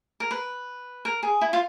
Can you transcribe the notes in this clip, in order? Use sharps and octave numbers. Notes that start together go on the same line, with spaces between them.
A#4
B4
A#4
G#4
E4
F4